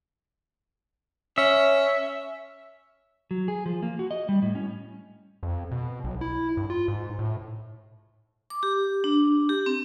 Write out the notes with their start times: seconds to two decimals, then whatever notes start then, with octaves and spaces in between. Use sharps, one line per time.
1.38 C#4 E5
3.31 F#3
3.48 G#4
3.66 F3
3.83 A#3
3.99 F#4
4.11 D#5
4.29 G3
4.42 A2
4.55 C#4
5.43 F2
5.71 B2
6.04 B1
6.21 E4
6.57 G2
6.70 F4
6.88 G#2
7.19 A2
8.50 D6
8.63 G4
9.04 D4
9.49 G4
9.66 C4